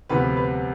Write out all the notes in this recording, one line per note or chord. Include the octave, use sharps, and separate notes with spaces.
D2 C3 F3 B3 B4
B4